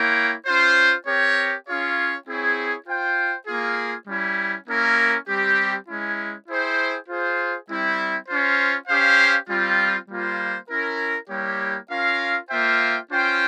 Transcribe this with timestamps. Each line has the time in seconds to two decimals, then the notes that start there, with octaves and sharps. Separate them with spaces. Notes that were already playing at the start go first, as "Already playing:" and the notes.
Already playing: A#3 E4 A#4 C#5 G5
0.47 C#4 F4 C5
1.07 C4 G4 A#4 C#5
1.67 C#4 F4 G#4 C#5 F5
2.27 C4 E4 G#4 C#5
2.87 F4 C5 G5
3.47 A#3 F4 G#4
4.07 G3 C#4 E4
4.68 A#3 C#4 E4 A#4
5.28 G3 C4 G4
5.88 G#3 C#4 E4
6.48 E4 G#4 C5 G5
7.08 F4 G#4 C5
7.69 G3 C4 E4
8.28 C#4 F4 C5
8.88 C#4 G4 C5 F5
9.49 G3 C4 F4
10.09 G3 A#3 F4 C5
10.69 C#4 E4 A#4
11.30 G3 A#3 E4 G4 C#5
11.90 C#4 F4 A#4 F5
12.50 A#3 F4 C5 E5 G5
13.10 C#4 F4 C5 G5